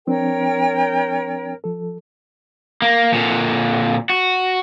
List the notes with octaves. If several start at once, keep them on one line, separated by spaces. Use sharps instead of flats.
F3 C4 D4 A#4 C#5 G5
F3 A4
A#3
A#2 D3
F#4